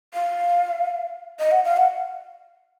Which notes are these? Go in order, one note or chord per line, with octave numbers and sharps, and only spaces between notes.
F5
D#5
F#5
F5
F#5